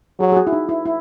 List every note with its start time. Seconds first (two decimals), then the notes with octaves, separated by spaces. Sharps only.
0.20 F#3 G#4
0.32 G#4
0.37 F#4
0.47 E4
0.53 D#4
0.69 E4
0.86 E4